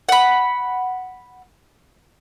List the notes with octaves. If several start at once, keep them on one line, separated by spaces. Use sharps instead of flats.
F#5 B5